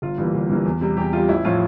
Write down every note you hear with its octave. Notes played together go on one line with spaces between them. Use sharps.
G1 F4
G2 E3 A#3
G1
G2 E3 A#3
E2
C3 G3
E2 G4
C3 G3 F4
A1 E4
A2 F3 F4